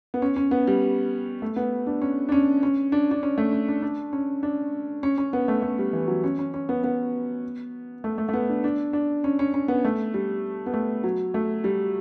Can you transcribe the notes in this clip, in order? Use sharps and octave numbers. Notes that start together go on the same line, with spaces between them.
B3
C#4
C#4
B3
G3
A3
B3
D4
C#4
D4
C#4
C#4
D4
D4
C#4
A3
C#4
D4
D4
C#4
D4
C#4
C#4
B3
A3
A3
G3
E3
F#3
C#4
C#4
C#4
B3
B3
A3
A3
A3
B3
D4
D4
D4
C#4
C#4
C#4
B3
A3
G3
B3
A3
F#3
A3
G3